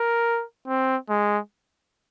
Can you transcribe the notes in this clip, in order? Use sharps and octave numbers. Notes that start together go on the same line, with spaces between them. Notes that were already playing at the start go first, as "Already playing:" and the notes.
Already playing: A#4
C4
G#3